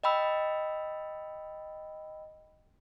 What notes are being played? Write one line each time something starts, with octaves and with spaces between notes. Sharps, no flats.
D#5 G5 B5 E6